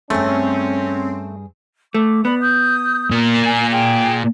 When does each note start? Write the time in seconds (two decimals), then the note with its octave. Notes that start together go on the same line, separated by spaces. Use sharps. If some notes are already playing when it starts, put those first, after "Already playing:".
0.10 G2 A3 C4 C#4 G#4
1.94 A3 D6
2.25 B3 D5 B5
2.41 D#6 G6
3.11 A#2 A#4
3.44 G#5
3.72 G#4 G5 G#5